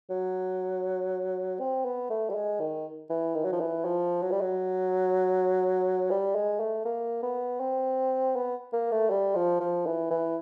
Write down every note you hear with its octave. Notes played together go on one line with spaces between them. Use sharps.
F#3
C4
B3
A3
G3
G#3
D#3
E3
D#3
F#3
F3
E3
F3
F#3
G3
F#3
G3
G#3
A3
A#3
B3
C4
B3
A#3
A3
G3
F3
F3
E3
E3